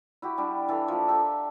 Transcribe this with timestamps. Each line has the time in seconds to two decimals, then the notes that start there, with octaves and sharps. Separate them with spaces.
0.22 E4 F#4 G4
0.37 G3 D4 E4
0.69 E3 A4
0.88 F3 A#3
1.08 G4 A4 E5